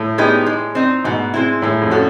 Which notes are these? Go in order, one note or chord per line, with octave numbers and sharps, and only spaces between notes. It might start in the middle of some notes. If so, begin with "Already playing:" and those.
Already playing: A2
G#3 B3 D#4 G4
G#3
C4 D#4
G#2 B2
G#3 C4 E4
A2 G#3
F2
C#4 F#4 A4